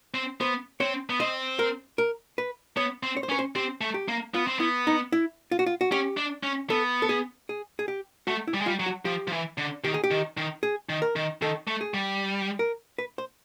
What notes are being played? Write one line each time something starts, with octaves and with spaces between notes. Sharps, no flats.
C4
B3 C5
C4 C#5
B3
C4 D#5
A#4
A#4
B4
B3 C#5
C4
C#5
C5
C#4 B4
C5
C4 G4
A3
G4
A#3
B3 F4
C4
B3 E4
D#4
E4
F4
F#4
F4
F#4
C#4 G4
D4
C#4
B3 A4
A4
G#4
G#4
G#4
G4
A3 F#4
E4
G3
G#3
G3 F4
F#3
F#4
F3 G4
F3
E3
D3
D#3 G4
G#4
G4
D#3
D#3
G#4
D#3
A#4
D#3
D#3 A4
A3
G#4
G3
A#4
B4
C5